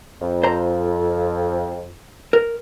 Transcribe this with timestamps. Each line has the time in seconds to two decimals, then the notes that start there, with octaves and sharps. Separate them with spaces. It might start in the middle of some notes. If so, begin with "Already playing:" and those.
0.21 F2
0.43 C5 A#5
2.33 A#4